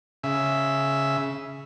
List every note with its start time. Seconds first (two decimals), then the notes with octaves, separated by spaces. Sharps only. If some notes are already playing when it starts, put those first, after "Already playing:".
0.24 C#3 E5